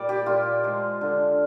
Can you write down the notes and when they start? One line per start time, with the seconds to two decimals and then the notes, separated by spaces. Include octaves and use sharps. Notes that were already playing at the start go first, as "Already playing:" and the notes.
Already playing: A#2 G3 D5
0.09 G4
0.26 A#2 F4
0.64 F3 G#3
1.01 D3